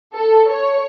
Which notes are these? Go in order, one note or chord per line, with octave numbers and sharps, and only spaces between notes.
A4
C#5